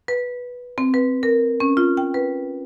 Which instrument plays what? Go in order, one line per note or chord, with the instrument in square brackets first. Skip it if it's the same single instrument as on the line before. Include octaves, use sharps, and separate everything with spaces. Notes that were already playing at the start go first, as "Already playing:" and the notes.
[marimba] B4
C4
B4
A#4
C#4
F4
G5
B4